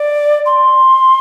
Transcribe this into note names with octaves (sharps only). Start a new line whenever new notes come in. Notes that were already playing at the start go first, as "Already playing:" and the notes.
Already playing: D5
C6